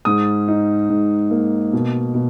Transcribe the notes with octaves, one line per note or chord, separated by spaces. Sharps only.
G#2 D#6
D#4
G#2
A#3
B2
B2